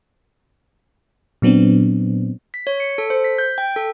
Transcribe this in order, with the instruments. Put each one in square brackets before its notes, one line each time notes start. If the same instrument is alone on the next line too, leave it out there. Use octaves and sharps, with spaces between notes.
[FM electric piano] A#2 F#3 B3 C4 D4
[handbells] B6
C#5
C#7
A4
C5
B6
G6
G5
A4